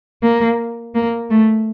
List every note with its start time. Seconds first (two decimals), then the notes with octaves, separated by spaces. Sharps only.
0.23 A#3
0.95 A#3
1.31 A3